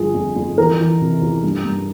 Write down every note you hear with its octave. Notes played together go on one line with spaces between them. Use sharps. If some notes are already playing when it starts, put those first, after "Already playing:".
Already playing: G1 F3 G#4
F2
F2
E2 A#4
E3
C3
E2
G2
G2